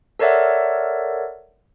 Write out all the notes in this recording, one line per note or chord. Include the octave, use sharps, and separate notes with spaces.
A4 A#4 C#5 D5 E5 F#5